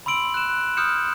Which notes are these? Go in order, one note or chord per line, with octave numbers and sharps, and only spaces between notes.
B5 C6 E6 D7 F#7
F#6 E7
F#6
D#6 F6 G6 C#7 E7